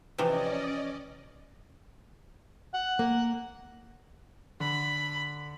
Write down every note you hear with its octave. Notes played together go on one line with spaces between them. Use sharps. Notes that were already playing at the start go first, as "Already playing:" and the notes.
C3 E3 F3 C#4 D5 D#5
F#5
A#3
D3 B5